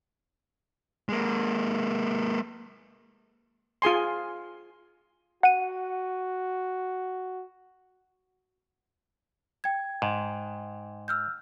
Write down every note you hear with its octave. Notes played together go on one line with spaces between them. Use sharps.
G#3 A#3
F4 G#4 G#5 C6
F#4 F#5 D#7
G5 G#6
G#2
E6 F6 G6